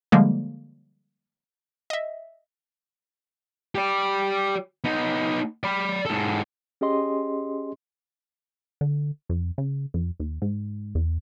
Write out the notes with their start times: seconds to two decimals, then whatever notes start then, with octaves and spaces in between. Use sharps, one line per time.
0.12 D3 F3 G3 G#3 A#3
1.90 D#5 E5
3.75 G4 D5
4.84 B3 D#4
5.64 D5 B5
6.05 G#2 A4
6.81 C#4 G4 G#4 D#5 C6
8.81 D3
9.29 F2
9.58 C#3
9.94 F2
10.20 D#2
10.42 G#2
10.95 E2